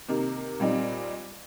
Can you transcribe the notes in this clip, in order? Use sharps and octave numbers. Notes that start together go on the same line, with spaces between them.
C3 D#3 A#3
A#2 G3 C4 D#4